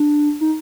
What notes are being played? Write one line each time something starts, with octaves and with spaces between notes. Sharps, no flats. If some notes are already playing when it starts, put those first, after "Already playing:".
Already playing: D4
D#4